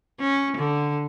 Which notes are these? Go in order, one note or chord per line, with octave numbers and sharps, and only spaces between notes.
C#4
D3